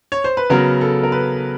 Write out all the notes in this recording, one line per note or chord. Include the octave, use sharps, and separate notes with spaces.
C#5
C5
B4
C#3 F#3 B3 A#4
A4
A#4
B4